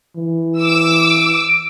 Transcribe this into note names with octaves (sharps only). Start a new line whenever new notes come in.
E3
D6 E6
D7